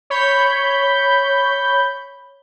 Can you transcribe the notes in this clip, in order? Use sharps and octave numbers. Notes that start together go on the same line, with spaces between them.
C#5 B5 G6